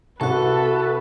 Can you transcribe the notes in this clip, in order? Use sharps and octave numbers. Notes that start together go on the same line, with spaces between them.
C2 F#4 A4 B4 C#6